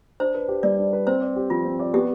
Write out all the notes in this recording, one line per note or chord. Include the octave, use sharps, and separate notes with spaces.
D4 C5
B4
G4
G3 D5
D4
B4
C4 C5
D5
G4
F3 F4
C4
D5
B3 G4